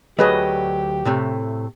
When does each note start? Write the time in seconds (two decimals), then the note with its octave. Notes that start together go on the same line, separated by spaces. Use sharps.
0.19 D2 F#3 A3 G4 G#4 B4 D#5
1.05 A2 C3 A3